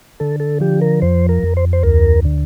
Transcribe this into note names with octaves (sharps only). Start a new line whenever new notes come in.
D3 A4
A4
F3 G4
A#4
F2 C5
A#4
F2
C5
C5
D2 A#4
D3